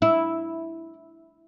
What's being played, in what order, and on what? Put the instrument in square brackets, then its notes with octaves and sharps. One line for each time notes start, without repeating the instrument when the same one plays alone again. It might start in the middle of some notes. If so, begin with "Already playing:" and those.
[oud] E4